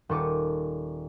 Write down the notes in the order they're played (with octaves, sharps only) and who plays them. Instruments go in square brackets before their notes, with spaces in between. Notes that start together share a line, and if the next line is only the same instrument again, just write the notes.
[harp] D#1 D#3 A4 C#6 D6 D#7